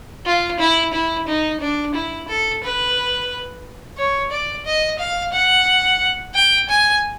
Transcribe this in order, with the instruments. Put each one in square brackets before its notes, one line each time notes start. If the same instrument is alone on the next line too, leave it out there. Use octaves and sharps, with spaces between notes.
[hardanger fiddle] F4
E4
E4
D#4
D4
E4
A4
B4
C#5
D5
D#5
F5
F#5
G5
G#5